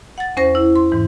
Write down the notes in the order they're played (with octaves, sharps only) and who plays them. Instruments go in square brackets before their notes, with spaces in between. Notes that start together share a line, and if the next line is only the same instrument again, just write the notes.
[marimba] F#5 A6
E2 C#4 C5 A#6
E4
C6
G#2 E3